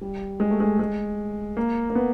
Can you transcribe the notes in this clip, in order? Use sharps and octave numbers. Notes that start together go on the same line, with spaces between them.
G3
G#3
A3
G#3
G#3
A#3
A#3
B3